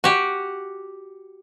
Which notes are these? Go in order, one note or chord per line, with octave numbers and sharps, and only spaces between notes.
F#4 G4